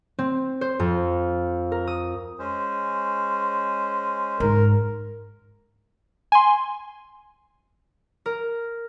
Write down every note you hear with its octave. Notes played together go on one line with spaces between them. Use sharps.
C4
C5
F2
A#4
D#6
G#3 C#4 C5
G#2 A#4
G#5 C6
A#4